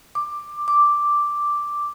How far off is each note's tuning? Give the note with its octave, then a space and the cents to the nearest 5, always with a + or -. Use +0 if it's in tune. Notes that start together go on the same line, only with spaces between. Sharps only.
D6 +10
D6 +0